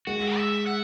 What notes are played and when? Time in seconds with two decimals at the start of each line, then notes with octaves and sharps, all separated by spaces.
0.07 G#3 F#4
0.36 E5
0.67 F#5